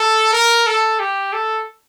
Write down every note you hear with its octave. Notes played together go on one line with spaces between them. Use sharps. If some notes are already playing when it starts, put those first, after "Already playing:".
Already playing: A4
A#4
A4
G4
A4